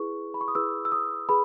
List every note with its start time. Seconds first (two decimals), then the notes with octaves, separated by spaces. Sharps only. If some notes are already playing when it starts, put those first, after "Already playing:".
Already playing: E4 G#4 B4 C#6
0.34 B5
0.41 C#6
0.48 D#6
0.55 E4 G#4 B4 E6
0.85 E6
0.92 D#6
1.29 G#4 B4 B5